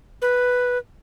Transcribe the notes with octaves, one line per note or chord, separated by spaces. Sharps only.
B4